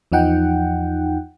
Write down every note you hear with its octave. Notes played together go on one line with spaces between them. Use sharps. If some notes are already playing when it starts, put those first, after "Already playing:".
E2 F3 D#4 F#5 G5